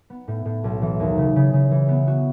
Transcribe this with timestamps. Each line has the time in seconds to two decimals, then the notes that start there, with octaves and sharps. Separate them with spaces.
0.10 B3
0.28 A2
0.45 A2
0.64 B1
0.82 E3
1.00 D#2
1.18 C#3
1.36 C#3
1.53 C#3
1.71 E3
1.88 B3
2.07 F#4